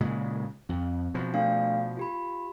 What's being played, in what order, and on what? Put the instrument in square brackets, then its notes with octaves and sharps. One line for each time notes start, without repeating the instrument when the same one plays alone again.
[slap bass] A#2 C#3 G#3
[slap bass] F2 [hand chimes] C4
[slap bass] B2 F3
[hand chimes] A3 D4 F5
F4 G4 B5